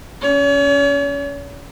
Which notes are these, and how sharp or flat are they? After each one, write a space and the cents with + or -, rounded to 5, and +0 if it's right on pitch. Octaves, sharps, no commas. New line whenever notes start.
C#4 +15 C#5 +40